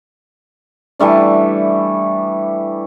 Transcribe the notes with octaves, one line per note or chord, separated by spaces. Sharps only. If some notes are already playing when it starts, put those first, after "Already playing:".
E3 G3 A3 D4